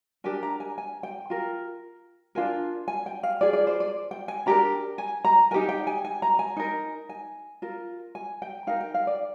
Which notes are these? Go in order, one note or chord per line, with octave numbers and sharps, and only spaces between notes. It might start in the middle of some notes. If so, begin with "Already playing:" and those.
D4 G4 A#4 G#5
A#5
G#5
G#5
G5
F4 A#4
D4 F4 A#4 G#5
G#5
G5
F5
F4 G#4 D5
D5
C5
D5
G5
G#5
D4 G4 A#4 A#5
G#5
A#5
D#4 G4 A#4 G#5
G5
G#5
G#5
A#5
G#5
D#4 A#4
G#5
F4 A#4
G#5
G5
D#4 A#4 F5
G5
F5
D5